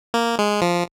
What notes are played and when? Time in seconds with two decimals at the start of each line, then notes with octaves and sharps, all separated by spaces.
0.14 A#3
0.39 G#3
0.62 F3